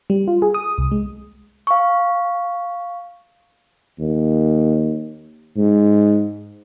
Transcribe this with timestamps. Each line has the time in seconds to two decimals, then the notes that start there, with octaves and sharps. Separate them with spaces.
0.10 G3
0.28 F4
0.42 G#4
0.54 D#6
0.78 C2
0.91 G#3
1.67 F5 C#6
3.99 D#2
5.56 G#2